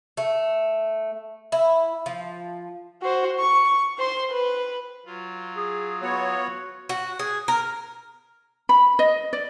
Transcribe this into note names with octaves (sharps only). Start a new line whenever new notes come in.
A3
E4
F3
F#4 C5
C#6
C5 C6
B4
F#3 F4
G#4
B3 F#4 C#5
F#4
G#4
A#4
B5
D#5
D5